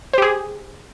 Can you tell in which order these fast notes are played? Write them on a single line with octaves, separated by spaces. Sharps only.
C5 G4 G#4